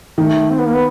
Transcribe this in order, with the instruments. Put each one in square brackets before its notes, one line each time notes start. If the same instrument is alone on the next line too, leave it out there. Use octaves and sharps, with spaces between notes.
[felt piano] D#3 [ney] A3
[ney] C4
B3
A#3
B3